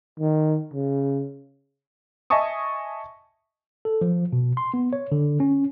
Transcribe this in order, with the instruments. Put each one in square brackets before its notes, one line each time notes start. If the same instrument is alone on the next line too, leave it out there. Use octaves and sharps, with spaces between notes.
[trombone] D#3
C#3
[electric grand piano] D#5 E5 G#5 A5 C#6 D#6
[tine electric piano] A4
F3
B2
C6
B3
C#5
D3
C#4